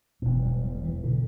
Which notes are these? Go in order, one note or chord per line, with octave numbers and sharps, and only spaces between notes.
E1 E2 B2 B3
E3
G3
G3
G3
E3
B2 D3